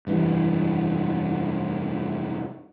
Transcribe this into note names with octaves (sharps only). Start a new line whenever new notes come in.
F1 G2 E3